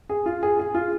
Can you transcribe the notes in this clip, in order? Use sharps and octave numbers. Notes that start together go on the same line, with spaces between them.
G#4
F4
G#4
G#4
F4